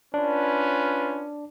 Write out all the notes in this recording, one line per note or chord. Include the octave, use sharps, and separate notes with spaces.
C#4 D4 F4 B4